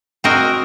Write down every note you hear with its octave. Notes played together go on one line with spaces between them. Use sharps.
C4 F#4 A#4 D#5